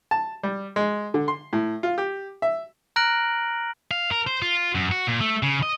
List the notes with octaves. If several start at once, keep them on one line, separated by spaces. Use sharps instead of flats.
A5
G3
G#3
D3
C6
A2
F4
G4
E5
A#5 F6 F#6 A#6 D7 F#7
F5
A#4
C5
F4
F#2
F#4
A#2
A3
C#3
D#5